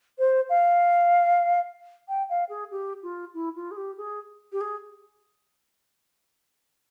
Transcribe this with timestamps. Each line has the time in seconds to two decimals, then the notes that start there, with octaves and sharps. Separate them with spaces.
0.19 C5
0.49 F5
2.08 G5
2.29 F5
2.49 G#4
2.71 G4
3.03 F4
3.34 E4
3.55 F4
3.71 G#4
3.77 G4
3.97 G#4
4.52 G4
4.61 G#4